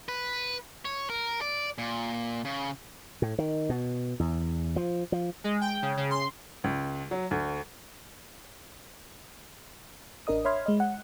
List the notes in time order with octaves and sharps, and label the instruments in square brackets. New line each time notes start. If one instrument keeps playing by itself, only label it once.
[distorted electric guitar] B4
C#5
A#4
D5
A#2
C#3
[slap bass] A2
D#3
B2
E2
F3
F3
[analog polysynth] G#3
G5
C#3
C#3
C6
[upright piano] C#2
F#3
D2
[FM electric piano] A1 D4 A#4 D#5 D#6
C#5 E5 B5 C6 F6 G#6
G#3 D#5
F#5